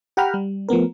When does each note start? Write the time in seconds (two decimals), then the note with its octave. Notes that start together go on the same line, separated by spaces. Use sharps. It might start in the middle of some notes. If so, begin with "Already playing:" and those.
0.17 G4 F#5 G5 A#5 B5 F6
0.34 G3
0.69 F3 A3 B3 A#4